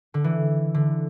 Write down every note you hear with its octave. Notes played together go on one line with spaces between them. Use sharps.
D3
E3
D3